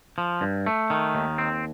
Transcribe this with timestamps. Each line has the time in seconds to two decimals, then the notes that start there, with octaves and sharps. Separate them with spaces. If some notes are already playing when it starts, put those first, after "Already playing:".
0.18 F3
0.41 G2
0.66 A3
0.90 D#3
1.15 D#2
1.38 C4